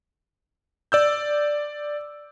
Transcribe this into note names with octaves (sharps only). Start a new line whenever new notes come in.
D5 E6 G6